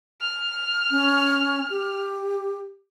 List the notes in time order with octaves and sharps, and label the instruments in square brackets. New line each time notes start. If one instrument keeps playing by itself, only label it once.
[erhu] F6
[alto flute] C#4
G4